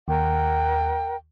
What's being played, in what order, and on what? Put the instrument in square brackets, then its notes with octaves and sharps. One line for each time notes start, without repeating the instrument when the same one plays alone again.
[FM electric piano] D#2 [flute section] A#4 F#5 G5